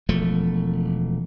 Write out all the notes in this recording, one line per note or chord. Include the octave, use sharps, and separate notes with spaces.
E1 F3 A3